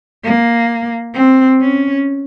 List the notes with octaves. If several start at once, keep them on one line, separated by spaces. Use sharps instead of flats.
A#3
C4
C#4